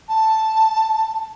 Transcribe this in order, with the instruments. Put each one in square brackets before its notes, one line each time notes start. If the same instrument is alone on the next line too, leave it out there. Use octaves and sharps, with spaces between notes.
[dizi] A5